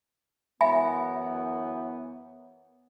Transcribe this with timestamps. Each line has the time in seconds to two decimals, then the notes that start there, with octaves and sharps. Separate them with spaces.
0.61 F#2 E3 B3 E5 G#5 B5